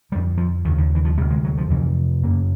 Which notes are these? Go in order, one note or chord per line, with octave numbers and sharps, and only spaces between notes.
F2 D3 G3
F3
D#2 C#3 D#3
D3
E3
F3
D2 C3 G3
G#3
F#3
F3
F2 C3 E3
F#2 C#3 A#3